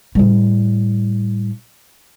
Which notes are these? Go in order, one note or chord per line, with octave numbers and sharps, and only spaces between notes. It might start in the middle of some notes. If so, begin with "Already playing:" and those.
A2 G3